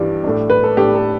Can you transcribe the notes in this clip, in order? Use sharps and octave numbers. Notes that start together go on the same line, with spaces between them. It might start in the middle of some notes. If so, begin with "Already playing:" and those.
Already playing: G2 E3 G3 D4 G4
A2 A3 D4
B4
A4
A2 A3 D4 G4
A4